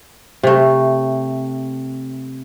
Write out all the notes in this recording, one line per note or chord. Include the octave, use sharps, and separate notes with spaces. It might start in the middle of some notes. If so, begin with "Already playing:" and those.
C3 A3